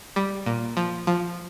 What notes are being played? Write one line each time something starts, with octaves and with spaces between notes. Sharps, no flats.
G3
A#2
F3
F3